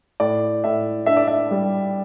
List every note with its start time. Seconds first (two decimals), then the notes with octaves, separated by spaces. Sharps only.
0.20 A2 D5
0.64 A2 E5
1.06 D4 E5
1.17 D5
1.27 E5
1.51 G3